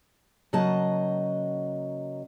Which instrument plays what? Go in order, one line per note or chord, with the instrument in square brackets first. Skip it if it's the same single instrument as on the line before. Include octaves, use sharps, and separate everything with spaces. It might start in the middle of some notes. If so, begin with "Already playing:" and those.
[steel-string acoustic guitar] C#3 F#3 A#3 D#5 F#5 A5